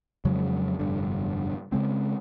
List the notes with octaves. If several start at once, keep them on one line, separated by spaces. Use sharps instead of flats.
F2 C#3 F#3 G#3
F1 G2 D3
C#3 G#3 C4